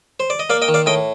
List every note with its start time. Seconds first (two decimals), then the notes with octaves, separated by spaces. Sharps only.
0.20 C5
0.30 D5
0.39 D#5
0.50 A#3 D5 F5
0.62 D#5 G5
0.68 D#3
0.74 D5 F5
0.86 A2 D#5 G5